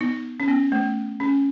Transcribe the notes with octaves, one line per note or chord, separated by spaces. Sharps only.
B3 D#4
C#4
B3
A3
C#4